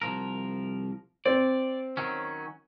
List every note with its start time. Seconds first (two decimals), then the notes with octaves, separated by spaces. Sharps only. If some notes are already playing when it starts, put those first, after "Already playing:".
0.02 C2 F3 A#4
1.26 C4 D5
1.97 D#3 F#3 C#4